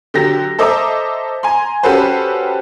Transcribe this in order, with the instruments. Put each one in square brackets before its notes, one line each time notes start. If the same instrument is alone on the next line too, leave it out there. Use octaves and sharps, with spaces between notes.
[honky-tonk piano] D3 F#3 G4 A#6
A4 C5 D#5 E5 A#5 D6
G#5 A#5 C6
C#4 F#4 G4 A4 B4 C5